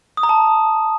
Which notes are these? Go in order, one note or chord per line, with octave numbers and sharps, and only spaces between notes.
D#6
A#5
A5